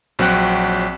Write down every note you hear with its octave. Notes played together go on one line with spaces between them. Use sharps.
A#1 F#3 C4 F#5 G5 F#6